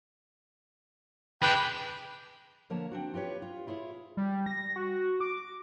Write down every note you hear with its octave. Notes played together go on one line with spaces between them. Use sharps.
G#3 D4 B4 G5
D3 F3 A#3 A#4 C#5 A5
C4 D4 F#4
F4 G4 B4 C#5
F4
E4 F4 G#4 C#5
G3
A#6
F#4
D6